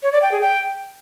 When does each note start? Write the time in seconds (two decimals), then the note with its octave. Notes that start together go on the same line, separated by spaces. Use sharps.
0.03 C#5
0.12 D5
0.22 G5
0.32 G#4
0.41 G5